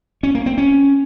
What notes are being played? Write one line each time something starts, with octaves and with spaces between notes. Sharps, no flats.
C#4
A#3
C4
C#4